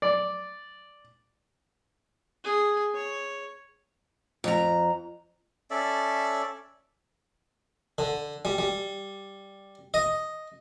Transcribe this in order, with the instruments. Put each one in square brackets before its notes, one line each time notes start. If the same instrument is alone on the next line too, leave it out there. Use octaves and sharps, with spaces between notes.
[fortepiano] D5
[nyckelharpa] G#4
C#5
[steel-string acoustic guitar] F2 A#5
[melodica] C#4 A4 D5 E5
[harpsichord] D3
G3
G3
D#5